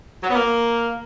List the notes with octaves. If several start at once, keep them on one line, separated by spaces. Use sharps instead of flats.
F#3
B3
A#3